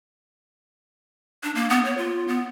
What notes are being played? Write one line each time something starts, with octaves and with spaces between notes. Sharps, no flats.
D4
A#3
B3
C#5
F4
B3